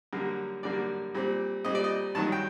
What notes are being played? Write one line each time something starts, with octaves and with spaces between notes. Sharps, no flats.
F#2 D3 G3 A#3
F#2 D3 G3 A#3 D5
A#2 G3 C4
A#2 G3 C4 D#5
D5
D#5
G2 D#3 F#3 A5
G5